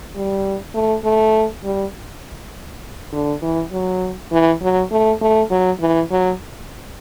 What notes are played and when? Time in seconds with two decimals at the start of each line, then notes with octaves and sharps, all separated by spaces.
0.15 G3
0.74 A3
1.04 A3
1.64 G3
3.13 D3
3.42 E3
3.72 F#3
4.32 E3
4.62 F#3
4.91 A3
5.21 A3
5.50 F#3
5.81 E3
6.11 F#3